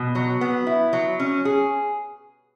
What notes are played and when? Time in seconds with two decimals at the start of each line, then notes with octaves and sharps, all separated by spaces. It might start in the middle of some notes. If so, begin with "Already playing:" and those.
Already playing: B2
0.15 F#3
0.41 B3
0.67 E4
0.93 F#3
1.20 C#4
1.45 G#4